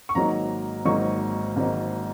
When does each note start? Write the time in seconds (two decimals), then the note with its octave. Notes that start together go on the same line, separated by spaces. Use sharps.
0.09 C#6
0.15 G#1 G#2 F#3 A#3 D#4 A#5
0.85 G#1 G#2 F#3 A#3 D#4 C#6
1.56 G#1 G#2 F#3 A#3 D#4